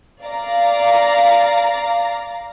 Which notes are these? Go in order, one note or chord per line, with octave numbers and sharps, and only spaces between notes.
D5 F5 A#5